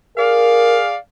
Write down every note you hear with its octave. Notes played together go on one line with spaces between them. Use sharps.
G#4 A#4 D5 F5